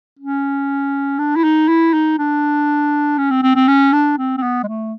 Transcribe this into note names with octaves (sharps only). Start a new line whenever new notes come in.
C#4
D4
E4
D#4
E4
D#4
D4
C#4
C4
C4
C4
C#4
D4
C4
C4
B3
G#3
A3